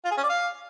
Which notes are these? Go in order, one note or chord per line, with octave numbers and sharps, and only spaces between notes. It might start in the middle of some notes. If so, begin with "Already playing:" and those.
F4
G#4
C#4
D5
F5